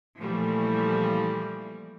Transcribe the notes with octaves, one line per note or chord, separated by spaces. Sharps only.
A#2 E3 F3 G3 A3